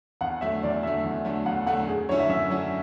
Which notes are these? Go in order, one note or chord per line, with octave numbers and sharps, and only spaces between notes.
E2 F#5
D3 F#3 A3 E5
E2 D5
D3 F#3 A3 E5
E2
D3 F#3 A3
E2 F#5
D3 F#3 A3 F#5
F#2 G#4
D3 F#3 C#4 E4 C#5
E5
F#2 E5
D3 F#3 C#4 E4